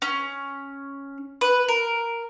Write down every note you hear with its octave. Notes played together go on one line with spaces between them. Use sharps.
C#4
B4
A#4